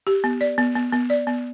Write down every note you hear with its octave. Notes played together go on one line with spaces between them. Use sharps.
G4
B3
D5
B3
B3
B3
D5
B3